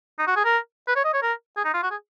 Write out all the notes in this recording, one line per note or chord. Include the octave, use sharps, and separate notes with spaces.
D#4
F#4
G#4
A#4
B4
C#5
D#5
C#5
A#4
G#4
D#4
F4
F#4
G#4